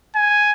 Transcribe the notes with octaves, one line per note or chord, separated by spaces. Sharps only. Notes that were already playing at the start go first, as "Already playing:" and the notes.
G#5